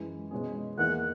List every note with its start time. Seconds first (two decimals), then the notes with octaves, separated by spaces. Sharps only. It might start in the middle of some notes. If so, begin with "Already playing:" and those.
Already playing: F#2 E3 G#3
0.31 B2 G#3 C#4 G#4
0.77 E2 D#3 A#3 E4 F#5